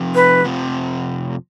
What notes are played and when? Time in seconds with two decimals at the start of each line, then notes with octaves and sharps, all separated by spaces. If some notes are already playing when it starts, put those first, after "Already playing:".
Already playing: F2 C3 F3
0.15 B4
0.45 F2 C3 F3